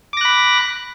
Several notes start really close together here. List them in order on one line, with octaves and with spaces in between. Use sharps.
D6 A#6 F#6 B5